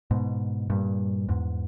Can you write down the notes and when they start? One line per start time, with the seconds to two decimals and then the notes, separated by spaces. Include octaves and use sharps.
0.11 G#2 B2
0.70 G2 A#2
1.29 E2 G#2